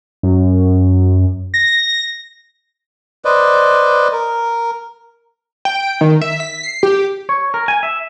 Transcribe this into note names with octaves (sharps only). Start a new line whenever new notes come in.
F#2
A#6
B4 C5 D5 D#5
A#4
G5
D#3
E5
B6
C7
G4
C#5
A#4
G#5
E5